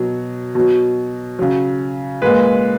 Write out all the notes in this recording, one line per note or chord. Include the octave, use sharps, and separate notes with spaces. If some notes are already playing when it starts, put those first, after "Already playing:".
Already playing: B2 F#3
B2 F#3
C#3 F#3
A#2 G#3 B4